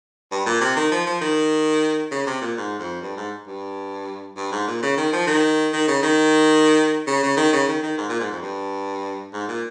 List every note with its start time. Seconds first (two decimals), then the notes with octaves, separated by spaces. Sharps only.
0.31 G2
0.46 A#2
0.61 C3
0.76 D#3
0.91 F3
1.06 F3
1.21 D#3
2.11 C#3
2.27 C3
2.41 A#2
2.57 G#2
2.79 F2
3.02 G2
3.17 G#2
3.47 G2
4.36 G2
4.52 G#2
4.67 A#2
4.83 C#3
4.97 D#3
5.12 F3
5.27 D#3
5.73 D#3
5.87 C#3
6.03 D#3
7.07 C#3
7.23 C#3
7.37 D#3
7.53 C#3
7.68 D#3
7.83 D#3
7.98 G#2
8.09 A#2
8.20 G#2
8.31 F2
8.42 G2
9.33 G#2
9.48 A#2